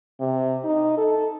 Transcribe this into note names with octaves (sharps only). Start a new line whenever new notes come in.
C3
D#4
A4